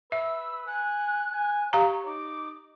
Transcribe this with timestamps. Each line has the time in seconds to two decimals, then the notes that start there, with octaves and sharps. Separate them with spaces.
0.12 B4 E5 E6
0.67 G#5 F#6
1.33 G#5
1.73 G4 C#5 F5 A#5
2.06 D#4 D6